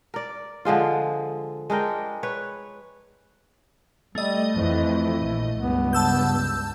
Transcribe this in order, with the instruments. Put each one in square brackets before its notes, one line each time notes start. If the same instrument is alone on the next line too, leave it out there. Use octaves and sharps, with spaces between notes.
[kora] A#4 D5
D3 F3 G#3 F4
G#3 D4 A#4 G5
B4 C#5
[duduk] G3 [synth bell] A3 D#5
[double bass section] F2 E3 [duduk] E4
[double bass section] A#1
[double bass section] C#2 G2 [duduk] B3
[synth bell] A5 E6 G6